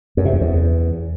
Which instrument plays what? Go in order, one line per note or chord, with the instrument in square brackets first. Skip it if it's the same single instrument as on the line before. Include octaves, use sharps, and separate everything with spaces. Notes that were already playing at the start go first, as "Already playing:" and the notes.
[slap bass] F#2
C3
F2
E2